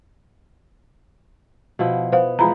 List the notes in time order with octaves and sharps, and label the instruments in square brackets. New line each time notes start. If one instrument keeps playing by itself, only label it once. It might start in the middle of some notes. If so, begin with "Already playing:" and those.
[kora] B2 F3 E4
[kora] B3 [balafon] C5 F5
[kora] E3 F3 G#3 [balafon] A#5 B5